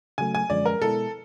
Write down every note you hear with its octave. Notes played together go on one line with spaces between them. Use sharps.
C#3 F#3 A3 G#5
G#5
F#2 D3 F3 G#3 C#4 D5
A#4
B2 G#3 B3 E4 A4